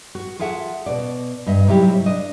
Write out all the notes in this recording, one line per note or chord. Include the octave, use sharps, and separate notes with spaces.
F#4
F4 G#4 A4 E5 F#5
B2 D5
G2 D#5 E5
G#2 C3 F#3 G3 E4 G4
D4 D#5